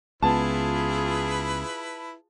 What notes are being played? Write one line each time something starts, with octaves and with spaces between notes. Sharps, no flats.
C#2 B3 E4 F4 G#4 B4 A5